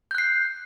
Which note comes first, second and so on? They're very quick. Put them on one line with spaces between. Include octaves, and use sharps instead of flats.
G6 F#6 C7